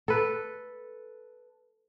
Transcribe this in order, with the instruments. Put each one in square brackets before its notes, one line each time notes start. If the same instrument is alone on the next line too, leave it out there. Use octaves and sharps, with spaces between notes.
[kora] A4 B4